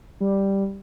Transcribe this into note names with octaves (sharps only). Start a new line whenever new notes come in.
G3